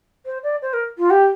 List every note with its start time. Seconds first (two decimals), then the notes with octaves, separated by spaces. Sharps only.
0.26 C5
0.43 D5
0.62 C5
0.73 A#4
0.98 F4
1.11 G4